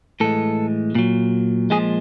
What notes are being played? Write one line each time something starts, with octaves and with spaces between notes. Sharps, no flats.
A2 E3 G#3 A4
A#2 F#3
A#2 F3 G#3 G#4